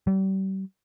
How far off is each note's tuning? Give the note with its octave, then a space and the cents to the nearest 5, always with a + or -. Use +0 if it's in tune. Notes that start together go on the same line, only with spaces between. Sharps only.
G3 -35